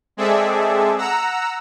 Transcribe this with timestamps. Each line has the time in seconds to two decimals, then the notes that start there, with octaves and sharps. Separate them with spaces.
0.17 G#3 C4 G#4 A4 D5 E5
0.98 F#5 A#5 E6